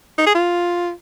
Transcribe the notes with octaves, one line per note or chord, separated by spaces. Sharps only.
D#4
G#4
F4